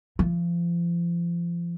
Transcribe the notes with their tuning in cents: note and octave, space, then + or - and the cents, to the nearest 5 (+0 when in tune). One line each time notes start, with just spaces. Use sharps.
F3 -30